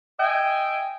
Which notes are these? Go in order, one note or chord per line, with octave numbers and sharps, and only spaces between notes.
D#5 E5 G5 G#5